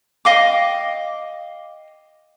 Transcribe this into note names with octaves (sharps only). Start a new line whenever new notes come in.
D#5 F5 G5 D6